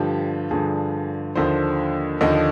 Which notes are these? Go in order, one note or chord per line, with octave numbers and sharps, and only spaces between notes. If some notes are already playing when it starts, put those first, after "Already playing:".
Already playing: G2 D3 F3 G4
G2 D3 F3 G#4
D#2 D3 F3 C5
D#2 D3 F3 D#5